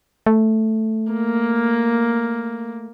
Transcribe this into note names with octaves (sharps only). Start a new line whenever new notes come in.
A3
A#3